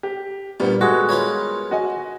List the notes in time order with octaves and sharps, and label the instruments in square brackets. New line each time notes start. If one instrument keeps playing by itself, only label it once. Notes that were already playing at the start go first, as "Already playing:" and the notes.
[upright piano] G4
[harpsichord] G2 A#2 [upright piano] G3 A#3 B3
[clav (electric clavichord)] G#3 F#4 [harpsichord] A4
[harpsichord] F4 B4 C#5
[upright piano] F#4 D#5 G#5